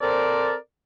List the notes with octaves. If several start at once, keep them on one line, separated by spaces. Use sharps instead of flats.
C4 A4 A#4 C5 D5